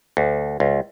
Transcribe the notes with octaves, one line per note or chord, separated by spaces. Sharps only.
D2
C#2